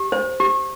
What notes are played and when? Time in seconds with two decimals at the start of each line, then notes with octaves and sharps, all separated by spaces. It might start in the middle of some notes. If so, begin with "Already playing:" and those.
Already playing: G4
0.12 C5
0.40 G4